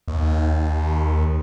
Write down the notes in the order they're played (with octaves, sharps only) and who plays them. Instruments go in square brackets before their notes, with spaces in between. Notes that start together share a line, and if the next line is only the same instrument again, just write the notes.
[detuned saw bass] D#2